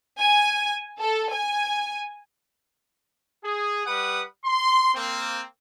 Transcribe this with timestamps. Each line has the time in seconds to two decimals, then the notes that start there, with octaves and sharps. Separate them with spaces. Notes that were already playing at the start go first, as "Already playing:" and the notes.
0.20 G#5
1.00 A4
1.31 G#5
3.43 G#4
3.86 G3 B4 F#5 D#6
4.45 C6
4.95 A#3 C4